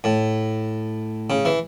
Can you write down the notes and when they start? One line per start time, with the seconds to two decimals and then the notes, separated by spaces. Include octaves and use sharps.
0.04 A2
1.30 C#3
1.45 E3